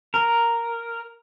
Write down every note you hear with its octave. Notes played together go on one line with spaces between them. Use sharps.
A#4